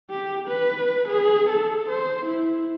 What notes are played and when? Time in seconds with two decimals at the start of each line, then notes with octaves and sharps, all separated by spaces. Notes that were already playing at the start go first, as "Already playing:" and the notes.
0.10 G4
0.48 B4
1.08 G#4
1.49 A4
1.89 C5
2.25 E4